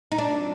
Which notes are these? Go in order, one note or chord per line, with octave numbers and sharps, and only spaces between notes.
D#4
F#3 A3 C4 D4 F4